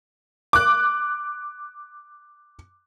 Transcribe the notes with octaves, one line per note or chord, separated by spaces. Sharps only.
D6 F#6